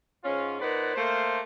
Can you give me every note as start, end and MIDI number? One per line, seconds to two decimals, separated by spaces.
0.24 0.56 44
0.24 0.56 61
0.24 0.56 65
0.60 0.94 46
0.60 0.94 63
0.60 0.94 71
0.60 0.94 72
0.60 0.94 74
0.60 0.94 78
0.96 1.40 57
0.96 1.40 58
0.96 1.40 72